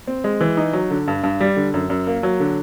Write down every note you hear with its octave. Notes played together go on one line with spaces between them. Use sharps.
C4
G#3
E3
D#4
F#3
D3
G2
G2
G3
D3
F#2
F#2
A#3
F#3
D3